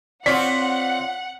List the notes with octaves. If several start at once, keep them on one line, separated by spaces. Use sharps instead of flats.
C4 F4 C#5 D5 F#5 B6